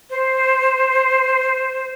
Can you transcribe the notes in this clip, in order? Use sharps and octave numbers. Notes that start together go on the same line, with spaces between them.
C5